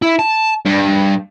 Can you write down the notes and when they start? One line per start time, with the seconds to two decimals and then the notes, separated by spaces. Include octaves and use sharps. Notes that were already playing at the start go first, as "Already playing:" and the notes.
0.02 E4
0.19 A5
0.66 G2